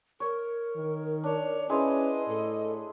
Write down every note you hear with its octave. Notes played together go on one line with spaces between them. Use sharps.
A#4 C#5
D#3
D4 C#5
C#4 E4 G#4 B4 C5 D#5
A2 A4